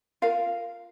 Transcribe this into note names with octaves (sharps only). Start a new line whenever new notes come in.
F4 A#4 F5